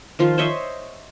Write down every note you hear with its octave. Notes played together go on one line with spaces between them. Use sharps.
D#3 F3 F4
C5 C#5 D#5 E5